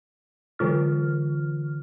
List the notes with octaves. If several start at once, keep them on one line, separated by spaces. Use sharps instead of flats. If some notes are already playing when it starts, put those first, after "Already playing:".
D3 E3 F4 F6